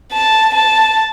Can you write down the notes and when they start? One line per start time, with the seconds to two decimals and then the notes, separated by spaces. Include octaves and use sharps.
0.13 A5
0.55 A5